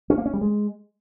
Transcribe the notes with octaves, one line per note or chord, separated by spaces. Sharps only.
C#4
A#3
C#4
G3
G#3